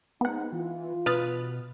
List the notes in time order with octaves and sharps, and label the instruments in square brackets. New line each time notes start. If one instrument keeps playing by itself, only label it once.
[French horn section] G#3 C4 D#4 [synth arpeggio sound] B3 F#5
[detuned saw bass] E3 [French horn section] F4
[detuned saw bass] B2 [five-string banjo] B4 [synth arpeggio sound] D#6 F6 A6